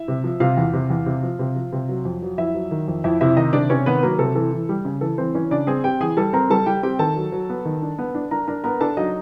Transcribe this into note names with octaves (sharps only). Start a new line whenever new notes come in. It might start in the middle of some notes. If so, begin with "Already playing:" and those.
Already playing: E4 E5
C3
F3
C3 F4 F5
E2
C3
E2
C3
F3
C3
F3
C3
F#3
F2
F#3
F2 E4 E5
F#3
D#3
F2
F2 E4 E5
C3 E4 E5
D#3 D#4 D#5
C3 D4 D5
C3 C#4 C#5
D#3 B3 B4
F#3 A#3 A#4
C3 A4
E3 A4
E3
G3
C#3
E3 A4
E3 C4 C5
E3 C#4 C#5
C#3 D4 D5
C4 G#4 G#5
C4 G4 G5
E3 G#4 G#5
G3 A4 A5
C4 A#4 A#5
G3 A4 A5
G3 G4 G5
C4 G4 G5
D#3 A4 A5
F#3
F#3
B3
D#3
D4
B3
D4
D4 A#4 A#5
D4 A#4 A#5
B3 A#4 A#5
D4 A4 A5
F#3 D#4 D#5